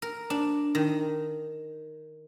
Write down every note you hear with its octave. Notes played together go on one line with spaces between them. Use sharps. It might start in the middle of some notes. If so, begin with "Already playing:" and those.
A#4
D4
D#3